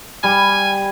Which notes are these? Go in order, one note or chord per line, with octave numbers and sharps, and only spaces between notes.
G3 G#5